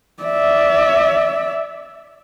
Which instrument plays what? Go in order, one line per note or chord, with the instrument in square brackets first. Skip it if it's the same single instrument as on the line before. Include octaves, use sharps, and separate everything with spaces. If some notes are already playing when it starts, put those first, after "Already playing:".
[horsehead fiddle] D5 E5